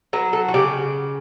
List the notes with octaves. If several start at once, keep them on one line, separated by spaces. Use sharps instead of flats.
F#3 B4
A4
F#4
C#3 G4